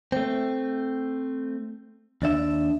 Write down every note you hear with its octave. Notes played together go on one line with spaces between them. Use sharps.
A3 C4
D#2 D4 D5 E5